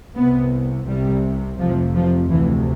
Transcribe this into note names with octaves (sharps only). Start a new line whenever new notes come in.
C2 C3 B3
C2 C3 G3
F1 F2 C3 F3
F3
D2 C3 E3